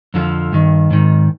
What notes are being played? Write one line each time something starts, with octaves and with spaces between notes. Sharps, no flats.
F2 D3 F3
G2 D#3
G#2 D#3